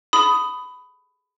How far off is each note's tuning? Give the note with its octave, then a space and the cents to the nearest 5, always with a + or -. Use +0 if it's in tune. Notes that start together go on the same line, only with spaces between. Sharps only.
B5 +15 D#6 +0